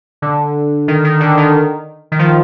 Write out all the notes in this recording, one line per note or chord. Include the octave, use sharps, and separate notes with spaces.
D3
D#3
D#3
D3
D#3
D#3
F3